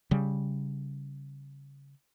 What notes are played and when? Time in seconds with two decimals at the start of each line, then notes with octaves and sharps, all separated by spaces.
0.11 C#3 G3